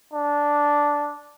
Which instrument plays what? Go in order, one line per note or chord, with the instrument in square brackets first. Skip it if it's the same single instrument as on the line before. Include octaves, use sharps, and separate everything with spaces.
[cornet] D4